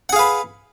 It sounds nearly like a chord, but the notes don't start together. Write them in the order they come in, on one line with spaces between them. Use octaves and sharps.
F#5 G#4 F5 B4